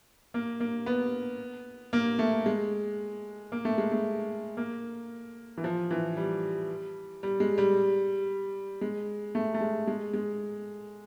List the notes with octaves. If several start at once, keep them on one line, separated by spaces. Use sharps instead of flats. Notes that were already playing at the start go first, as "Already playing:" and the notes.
A#3
A#3
B3
A#3
A3
G#3
A#3
A3
G#3
A3
A#3
E3
F3
E3
G3
G3
G#3
G3
G#3
A3
A3
G#3
G#3
G#3